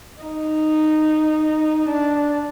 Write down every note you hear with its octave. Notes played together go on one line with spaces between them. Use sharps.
D#4
D4